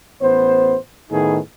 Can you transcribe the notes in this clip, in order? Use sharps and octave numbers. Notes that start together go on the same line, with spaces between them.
A1 B3 C5
A2 D#3 B3 D#4 G#4